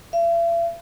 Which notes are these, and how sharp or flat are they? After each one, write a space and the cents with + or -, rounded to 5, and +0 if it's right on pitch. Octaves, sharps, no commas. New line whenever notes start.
E5 +45